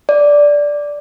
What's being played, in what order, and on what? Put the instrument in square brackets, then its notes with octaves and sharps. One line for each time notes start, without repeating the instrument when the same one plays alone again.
[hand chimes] D5